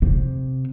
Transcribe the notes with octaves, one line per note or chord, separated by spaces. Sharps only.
C3